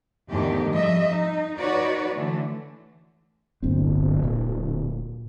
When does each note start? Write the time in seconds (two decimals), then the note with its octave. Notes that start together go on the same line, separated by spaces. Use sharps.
0.30 E2 G#2 D3 D#3 A3 G4
0.70 F2 F3 G3 D#5 E5
1.10 D#4
1.57 D#4 F#4 B4 C#5 D5
2.15 D3 E3 A3
3.62 D1 G1 A#2 C4
4.23 A#2